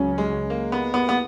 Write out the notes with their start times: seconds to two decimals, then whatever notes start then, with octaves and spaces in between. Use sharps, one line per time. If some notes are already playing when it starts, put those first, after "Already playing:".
Already playing: C#2 C#3 F#3 C#4
0.18 G#3
0.50 A#3
0.72 B3
0.94 B3
1.09 B3